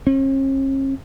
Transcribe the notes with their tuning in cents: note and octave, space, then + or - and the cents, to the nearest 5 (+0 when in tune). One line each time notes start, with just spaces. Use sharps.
C#4 -45